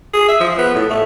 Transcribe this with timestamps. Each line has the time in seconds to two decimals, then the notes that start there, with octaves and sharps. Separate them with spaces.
0.13 G#4
0.28 E5
0.40 F3
0.58 B3
0.75 A2
0.90 A3